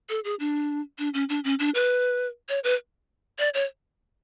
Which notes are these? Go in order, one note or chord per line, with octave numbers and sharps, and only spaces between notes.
A4
G#4
D4
D4
C#4
D4
C#4
D4
B4
C#5
B4
D5
C#5